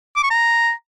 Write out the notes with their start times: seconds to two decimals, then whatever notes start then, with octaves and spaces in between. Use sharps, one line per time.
0.16 D6
0.23 C#6
0.30 A#5